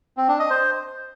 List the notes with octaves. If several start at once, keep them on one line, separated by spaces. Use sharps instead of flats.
C4
D4
D#5
C5